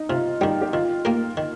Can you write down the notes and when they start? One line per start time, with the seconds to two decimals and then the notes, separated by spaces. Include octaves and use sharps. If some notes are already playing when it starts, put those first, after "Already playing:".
Already playing: D#4
0.09 C3 F4
0.41 D#3 G3 D#4 G4
0.61 G4
0.73 D#3 F4
1.05 A#3 G4 A#4
1.37 D#3